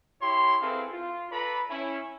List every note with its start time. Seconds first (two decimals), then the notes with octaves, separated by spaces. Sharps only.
0.22 E4 G4 C#5 C6
0.62 C4 E4 G#4 A4 B4 F5
0.92 F4
1.32 A4 B4 D5 A#5 B5
1.70 C#4 E4